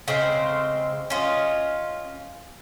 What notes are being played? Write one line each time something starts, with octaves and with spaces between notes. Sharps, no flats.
C#3 G#3 C4 C5
C#4 F4 D#5